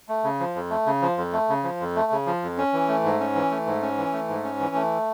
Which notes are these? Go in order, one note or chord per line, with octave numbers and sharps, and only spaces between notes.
A3
C#3
F3
F2
A3
C#3
F3
F2
A3
C#3
F3
F2
A3
C#3
F3
F2
C#4
E3
A3
G#2
C#4
E3
A3
G#2
C#4
E3
A3
G#2
C#4
E3
A3